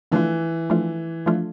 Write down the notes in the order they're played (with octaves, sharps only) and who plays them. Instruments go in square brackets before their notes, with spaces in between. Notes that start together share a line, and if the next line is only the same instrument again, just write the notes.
[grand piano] E3 [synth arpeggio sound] F3 A3 D4 F4
[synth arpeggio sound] F3 A3 D4 F4
F3 A3 D4 F4